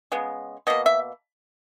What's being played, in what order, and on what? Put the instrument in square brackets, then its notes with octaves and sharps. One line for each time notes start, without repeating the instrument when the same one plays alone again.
[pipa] C#3 G#3 B3
B2 A#3 D#5
E5